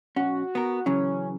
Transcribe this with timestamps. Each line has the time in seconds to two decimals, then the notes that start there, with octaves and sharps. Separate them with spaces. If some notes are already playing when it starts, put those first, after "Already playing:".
0.16 B1 C#4 F#4
0.55 B3 A#4
0.86 C#3 E3 F#3 C#4